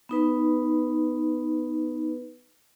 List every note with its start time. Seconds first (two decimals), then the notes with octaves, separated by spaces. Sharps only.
0.09 B3 D#4 B4